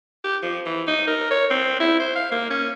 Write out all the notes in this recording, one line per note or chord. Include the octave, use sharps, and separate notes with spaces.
G4
F3
E3
D#4
A#4
C#5
C4
E4
C5
F5
A#3
C#4